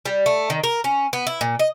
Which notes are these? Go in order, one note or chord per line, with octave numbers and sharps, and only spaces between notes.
G3
A3
D#3
A#4
C#4
B3
E4
A#2
D#5